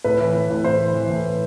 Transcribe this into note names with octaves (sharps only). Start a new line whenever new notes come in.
A2 B4
E3
E3
A2
A2 C5
E3
E3
A2